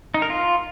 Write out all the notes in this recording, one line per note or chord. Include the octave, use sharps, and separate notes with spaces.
D#4
A#4
F4